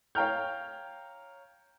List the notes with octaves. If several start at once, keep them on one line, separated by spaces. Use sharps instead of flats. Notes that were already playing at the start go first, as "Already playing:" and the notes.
C#5 F5 G5 A#5 F6 G6